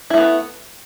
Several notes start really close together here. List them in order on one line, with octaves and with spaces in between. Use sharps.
E4 A3 B3